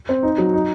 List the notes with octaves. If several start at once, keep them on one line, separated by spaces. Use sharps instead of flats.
C4
D#4
F#3
D#4